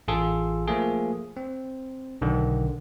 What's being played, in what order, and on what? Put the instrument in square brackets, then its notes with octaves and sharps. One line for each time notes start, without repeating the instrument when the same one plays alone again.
[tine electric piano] A1 F4 G#4 A4
F3 A3 A#3 G#4
C4
B1 D3 D#3